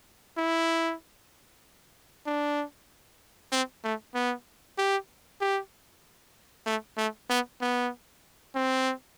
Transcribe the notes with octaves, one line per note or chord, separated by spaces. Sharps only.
E4
D4
C4
A3
B3
G4
G4
A3
A3
B3
B3
C4